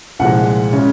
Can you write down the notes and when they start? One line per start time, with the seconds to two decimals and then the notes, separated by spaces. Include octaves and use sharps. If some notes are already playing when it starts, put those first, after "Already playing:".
0.19 C2 A#2 F3 G#3 F#5
0.73 C#3 G#3 C#4